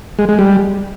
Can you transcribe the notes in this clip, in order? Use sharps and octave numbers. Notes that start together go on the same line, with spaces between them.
G#3
G#3
G3